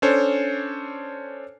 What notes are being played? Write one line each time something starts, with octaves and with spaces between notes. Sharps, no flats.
C#4 D4 A4 C5 C#5